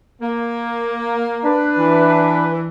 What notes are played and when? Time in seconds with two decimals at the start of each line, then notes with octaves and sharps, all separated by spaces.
0.22 A#3
1.44 D4 B4
1.78 E3